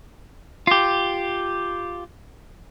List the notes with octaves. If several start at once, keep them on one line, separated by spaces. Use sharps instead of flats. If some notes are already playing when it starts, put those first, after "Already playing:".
F4 G4